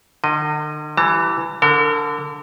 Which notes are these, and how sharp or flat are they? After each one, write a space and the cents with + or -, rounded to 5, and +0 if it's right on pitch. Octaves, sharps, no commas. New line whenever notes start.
D3 +45 D#5 +0
E3 +10 G3 -20 A#5 -45
D3 -15 A#4 -40